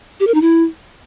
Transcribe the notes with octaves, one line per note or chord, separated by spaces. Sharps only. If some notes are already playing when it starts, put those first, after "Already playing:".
G4
A#4
D#4
E4